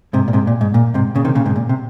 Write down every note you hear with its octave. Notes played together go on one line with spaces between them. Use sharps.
G#2 C3
A#2
G#2 C3
A#2
G#2
A#2
G#2 C3
A#2 C#3
C3 D#3
A#2 C#3
G#2 C3
A#2
C3